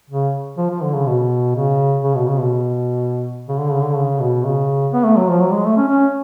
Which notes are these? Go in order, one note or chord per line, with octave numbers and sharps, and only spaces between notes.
C#3
F3
F3
D3
C#3
B2
C#3
C#3
B2
C#3
B2
C#3
D3
C#3
D3
C#3
B2
C#3
B3
A3
F#3
F3
F#3
G#3
A3
C#4
C#4